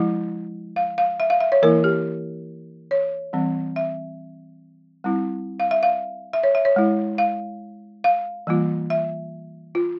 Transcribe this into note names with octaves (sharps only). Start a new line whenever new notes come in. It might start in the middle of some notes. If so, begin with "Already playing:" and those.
Already playing: F3 G#3 E4
F5
F5
E5
F5
E5
C#5
E3 A#3 E4 A#4
G4
C#5
E3 G3 C4
E5
G3 C4 E4
F5
E5
F5
E5
C#5
E5
C#5
G#3 E4
F5
F5
E3 G3 A#3 F4
E5
F4